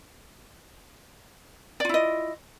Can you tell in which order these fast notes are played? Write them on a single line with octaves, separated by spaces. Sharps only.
D5 F4 E4 D#5